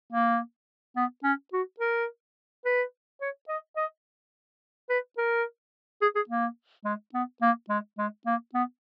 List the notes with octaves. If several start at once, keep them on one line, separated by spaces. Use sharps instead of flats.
A#3
B3
C#4
F#4
A#4
B4
C#5
D#5
D#5
B4
A#4
G#4
G#4
A#3
G#3
B3
A#3
G#3
G#3
A#3
B3